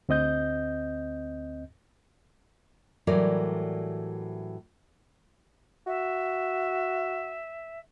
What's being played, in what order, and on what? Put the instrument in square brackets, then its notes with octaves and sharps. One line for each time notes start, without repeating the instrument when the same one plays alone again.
[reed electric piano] D2 C4 D#5 G6
[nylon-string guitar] A2 E3 F#3 G3 A#4 D5
[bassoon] F#4 [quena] E5